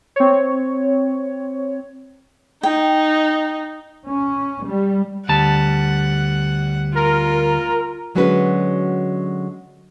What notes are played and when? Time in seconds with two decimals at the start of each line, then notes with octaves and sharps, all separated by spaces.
0.16 C4 C#5
2.63 D#4 G5
4.06 C#4
4.66 G3
5.29 D2 G3 F#5 A5
6.95 F4 A#4
8.15 D3 F#3 G#3 C#4 F#4 B4